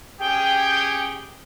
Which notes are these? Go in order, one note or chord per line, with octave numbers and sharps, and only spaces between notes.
C#4 G4 G#4 G5